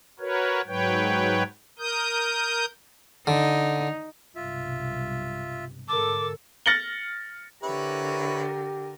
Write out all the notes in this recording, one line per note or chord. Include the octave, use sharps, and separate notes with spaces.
F#4 A#4 B4 C#5
G#2 F#3 B4 C#5 G5
A#4 D#6 G6
D3 D#4
B1 G2 C3 F4 E5
G#2 D3 A4 A#4 A5 D6 E6
F6 A6 A#6 C#7 F#7 G7
D3 E4 G4 A#4 B4 C#5